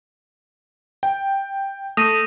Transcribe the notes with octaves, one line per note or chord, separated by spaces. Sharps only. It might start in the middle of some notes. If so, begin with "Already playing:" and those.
G5
A3 D#6 A#6 D#7